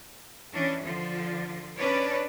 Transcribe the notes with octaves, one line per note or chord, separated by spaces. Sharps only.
E3 C#4 D4
D3 F3 F4
C#4 D4 B4 C#5 D5